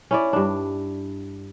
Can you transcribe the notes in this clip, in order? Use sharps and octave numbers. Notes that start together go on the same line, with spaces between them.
C#4 E4 D5
G2 D4